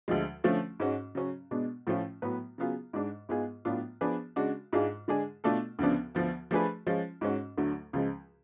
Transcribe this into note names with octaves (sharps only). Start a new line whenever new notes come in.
D2 D3 F3 G#3
D3 F3 A3 C#4 F4
G#2 G#3 C#4 F#4
C#3 F#3 C#4
B2 G#3 B3 D4
A2 F3 A3 C#4 F4
A2 F#3 B3 F#4 B4
C#3 F#3 B3 F4 G#4
G#2 G#3 D4
G#2 G#3 B3 F4 G#4
A2 F#3 B3 D4 F4
F3 B3 D4 G#4 B4
C#3 G#3 D4 F#4
G#2 G#3 D4 F4 G#4
D3 G#3 D4 G#4
B2 A3 D4 F4 A4
D2 C#3 F3 B3 D4
D2 D3 F3 B3
F3 A3 D4 G#4 B4
F3 G#3 C#4 F4
G#2 G#3 C#4 F#4
D2 D3 F#3 A3
C#2 C#3 F3 G#3